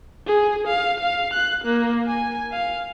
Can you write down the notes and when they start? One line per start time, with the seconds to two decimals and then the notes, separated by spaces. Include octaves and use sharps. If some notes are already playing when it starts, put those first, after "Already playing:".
0.27 G#4
0.67 F5
1.00 F5
1.33 F#6
1.65 A#3
2.08 G#5
2.52 F5